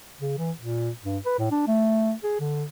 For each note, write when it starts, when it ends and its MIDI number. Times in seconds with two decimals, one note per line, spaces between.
0.21 0.33 49
0.38 0.51 52
0.58 0.90 46
1.04 1.18 43
1.25 1.38 71
1.38 1.48 45
1.51 1.64 62
1.67 2.12 57
2.24 2.37 68
2.40 2.64 50